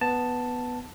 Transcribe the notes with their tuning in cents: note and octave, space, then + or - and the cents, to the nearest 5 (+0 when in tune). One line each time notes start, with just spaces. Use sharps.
B3 +0 A5 +5